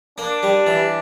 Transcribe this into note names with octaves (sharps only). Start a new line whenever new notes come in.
A#3 D4
G3
E3